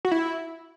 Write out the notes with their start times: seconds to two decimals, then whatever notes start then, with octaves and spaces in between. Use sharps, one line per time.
0.05 F#4
0.11 E4